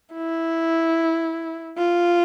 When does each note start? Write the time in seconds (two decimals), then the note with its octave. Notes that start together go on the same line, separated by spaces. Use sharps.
0.14 E4
1.77 F4